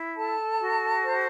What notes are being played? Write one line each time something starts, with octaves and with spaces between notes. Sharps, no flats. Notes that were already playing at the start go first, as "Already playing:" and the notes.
Already playing: E4
A4 A5
F#4
C5